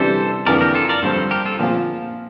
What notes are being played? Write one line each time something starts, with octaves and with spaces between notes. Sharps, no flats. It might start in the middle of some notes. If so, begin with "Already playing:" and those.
Already playing: C3 E3 G3 D4 G4 A4 C5
F2 E3 A#3 D4 A#4 D5
G4 A#4
F4 A4
A#4 D5
G2 F3 C4 A4 C5
G4 A#4
F4 A4
A#2 F3 C4 F4